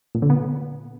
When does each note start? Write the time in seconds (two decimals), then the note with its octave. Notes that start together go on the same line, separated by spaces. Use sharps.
0.15 A#2
0.22 D3
0.30 B3